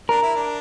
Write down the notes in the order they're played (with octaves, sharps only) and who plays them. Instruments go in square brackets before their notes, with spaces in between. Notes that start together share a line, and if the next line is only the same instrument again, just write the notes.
[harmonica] D4 [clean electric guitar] A#4
[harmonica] E4
D4